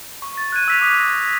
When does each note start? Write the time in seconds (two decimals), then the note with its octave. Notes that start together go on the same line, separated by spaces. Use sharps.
0.22 C#6
0.37 A6
0.52 F#6 G#6 D#7
0.68 E6 B6 F7
0.81 D6 D#6
1.00 A#6